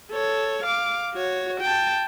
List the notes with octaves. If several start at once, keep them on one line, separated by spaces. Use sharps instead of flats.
A4 C#5
F5 D6
F#4 C#5
G5 A5